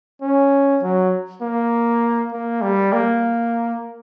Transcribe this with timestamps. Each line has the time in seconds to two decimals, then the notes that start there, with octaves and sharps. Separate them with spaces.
0.22 C#4
0.82 F#3
1.42 A#3
2.32 A#3
2.62 G3
2.93 A#3